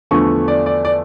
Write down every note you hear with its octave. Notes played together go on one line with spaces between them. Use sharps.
E2 D3 F3 A3 C#6
D5
D5
D5